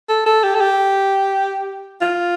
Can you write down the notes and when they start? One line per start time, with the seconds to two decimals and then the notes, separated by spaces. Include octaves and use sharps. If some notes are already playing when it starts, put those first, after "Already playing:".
0.09 A4
0.26 A4
0.44 G4
0.55 A4
0.61 G4
2.01 F4